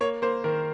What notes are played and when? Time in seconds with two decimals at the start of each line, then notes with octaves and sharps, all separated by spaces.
0.01 A#3 C#5
0.22 A#3 C5
0.44 D#3 A#4